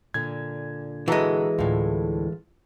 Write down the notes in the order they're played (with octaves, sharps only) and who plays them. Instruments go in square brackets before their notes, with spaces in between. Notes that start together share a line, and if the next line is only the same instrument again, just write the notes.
[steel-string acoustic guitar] A#2 D3 [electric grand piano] G#6
[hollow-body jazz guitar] E3 G#3 [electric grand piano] F#4 A4 A#5
[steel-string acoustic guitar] D2 A2 [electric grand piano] F4